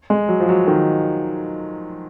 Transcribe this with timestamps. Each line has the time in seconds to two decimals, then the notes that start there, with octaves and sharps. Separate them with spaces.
0.10 G#3
0.29 F#3
0.40 F3
0.49 F#3
0.67 D#3